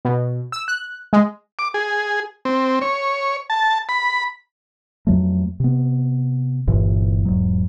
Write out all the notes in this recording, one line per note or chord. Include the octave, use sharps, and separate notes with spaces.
B2
E6
F#6
G#3
D6
G#4
C4
C#5
A5
B5
F2 F#3 A3
C3 B3
G1 G2 A#2 E3
E1 G#2 F#3